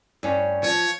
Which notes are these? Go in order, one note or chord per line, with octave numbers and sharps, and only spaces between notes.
G2 C#4
F3 C#5